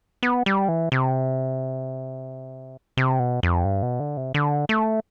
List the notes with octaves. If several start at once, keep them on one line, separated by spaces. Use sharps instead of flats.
B3
G3
E3
C3
C3
B2
F2
G2
B2
D3
C3
D3
A3